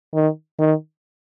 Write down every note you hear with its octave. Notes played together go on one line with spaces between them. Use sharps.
D#3
D#3